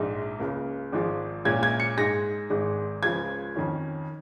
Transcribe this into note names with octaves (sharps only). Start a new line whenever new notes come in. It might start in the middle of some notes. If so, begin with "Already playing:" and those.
Already playing: A#1 G#2 G#3 D#4
C#2 C#3 A#3
G#1 G#2 F3 G#3
A#1 A#2 G#3 C#4 G#6
G#6
C#7
G#2 G#3 D#4 A#6
G#1 G#2 G#3
C#2 C#3 F3 G#3 G#6
F2 D#3 C#4